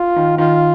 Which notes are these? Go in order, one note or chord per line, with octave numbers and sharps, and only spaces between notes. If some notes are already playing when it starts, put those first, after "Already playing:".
Already playing: F4
D#3
D#3 F4